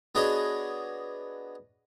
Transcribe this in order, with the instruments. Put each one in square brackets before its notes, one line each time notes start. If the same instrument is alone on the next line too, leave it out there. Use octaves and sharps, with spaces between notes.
[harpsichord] B3 D4 F#4 G#4 C#5 D#5